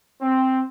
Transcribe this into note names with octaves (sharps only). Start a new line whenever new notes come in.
C4